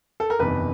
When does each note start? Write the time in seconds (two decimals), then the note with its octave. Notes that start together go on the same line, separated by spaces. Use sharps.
0.20 A4
0.30 A#4
0.39 F#1 E2 C3 D#3 B4